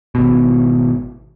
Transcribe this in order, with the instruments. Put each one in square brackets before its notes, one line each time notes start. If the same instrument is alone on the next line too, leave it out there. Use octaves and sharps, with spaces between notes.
[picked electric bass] G#1 B2